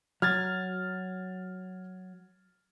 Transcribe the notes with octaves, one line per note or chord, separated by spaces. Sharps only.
F#3 F6 G#6 A6